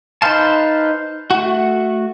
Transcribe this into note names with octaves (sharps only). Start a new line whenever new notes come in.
D#4 B4 C5 F5 A5
A3 F#4